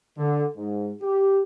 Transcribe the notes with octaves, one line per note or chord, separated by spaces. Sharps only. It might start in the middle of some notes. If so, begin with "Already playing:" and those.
D3
G#2
G4